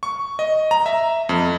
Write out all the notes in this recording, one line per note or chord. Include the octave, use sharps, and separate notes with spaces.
C#6
D#5
A#5
E5
F2